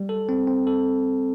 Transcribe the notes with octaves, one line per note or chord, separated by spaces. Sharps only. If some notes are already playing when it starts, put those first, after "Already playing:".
Already playing: G3
A4
C4
C4
A4